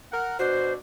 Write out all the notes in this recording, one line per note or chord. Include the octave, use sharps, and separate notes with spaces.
A#4 F#5
B2 D4 F#4 C5